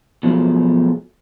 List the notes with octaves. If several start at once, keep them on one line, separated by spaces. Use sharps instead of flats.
B2 F3 F#3 G#3 A3